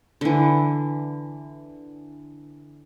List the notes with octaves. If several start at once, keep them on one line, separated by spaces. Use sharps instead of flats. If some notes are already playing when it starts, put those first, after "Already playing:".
D3 E3